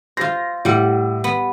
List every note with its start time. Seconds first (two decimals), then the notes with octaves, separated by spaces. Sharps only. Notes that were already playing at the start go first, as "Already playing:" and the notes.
0.17 F4 C5 A#6
0.65 A2 G3 F#5
1.24 B3